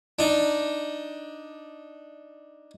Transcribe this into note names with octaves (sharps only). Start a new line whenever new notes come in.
D4 D#4